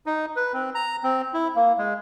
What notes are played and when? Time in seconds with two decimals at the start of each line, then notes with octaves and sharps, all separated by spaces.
0.06 D#4
0.36 B4
0.53 C4
0.75 A#5
1.03 C4
1.34 E4
1.56 A#3
1.78 G#3